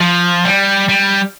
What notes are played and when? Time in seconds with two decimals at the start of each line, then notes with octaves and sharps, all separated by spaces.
0.01 F3
0.45 G3
0.89 G3